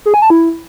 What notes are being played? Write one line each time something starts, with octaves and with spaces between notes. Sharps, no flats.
G#4
G#5
A5
E4